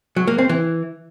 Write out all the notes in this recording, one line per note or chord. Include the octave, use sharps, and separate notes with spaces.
F#3
A#3
C4
E3